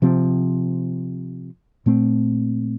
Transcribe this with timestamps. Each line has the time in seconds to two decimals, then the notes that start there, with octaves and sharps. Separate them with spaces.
0.02 C3 F3 C4
1.86 A#2 A3 C4